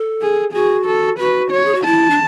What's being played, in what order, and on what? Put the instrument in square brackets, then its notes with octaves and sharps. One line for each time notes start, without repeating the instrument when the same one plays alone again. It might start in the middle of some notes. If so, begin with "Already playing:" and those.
Already playing: [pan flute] A4
[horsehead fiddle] G#4
[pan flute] F#4 [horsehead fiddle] G#4
[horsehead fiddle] A4
[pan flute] F#4 [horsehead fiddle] B4
[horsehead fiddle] C#5
[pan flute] G#4
F#4
[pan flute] E4 [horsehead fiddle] A5
[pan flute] D4